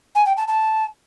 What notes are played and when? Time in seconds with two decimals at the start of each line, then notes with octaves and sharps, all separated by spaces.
0.15 G#5
0.25 G5
0.36 A5
0.47 A5